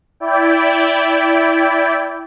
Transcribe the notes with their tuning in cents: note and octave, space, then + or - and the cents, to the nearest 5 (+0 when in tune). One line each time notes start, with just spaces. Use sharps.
E4 +0 D5 -25 G5 +0